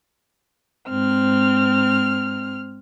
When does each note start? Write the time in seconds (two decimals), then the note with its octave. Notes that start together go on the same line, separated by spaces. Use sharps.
0.89 G#2 C4 F6